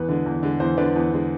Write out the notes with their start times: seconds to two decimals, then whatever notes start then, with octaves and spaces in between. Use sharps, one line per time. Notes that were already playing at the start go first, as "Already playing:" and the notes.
Already playing: E2 B4
0.09 D3 G#3
0.26 E2
0.43 D3 G#3
0.60 E2 C5
0.78 D3 G#3 B4 D5
0.95 E2
1.12 D3 G#3